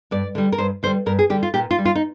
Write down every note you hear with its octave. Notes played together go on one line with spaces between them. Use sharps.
G2 D5
D3 G3
A#4
G2 C5
D3 G3 C5
G2 A#4
G#4
D3 G3 G4
F4
A#2 G4
F4
G3
F4
D#4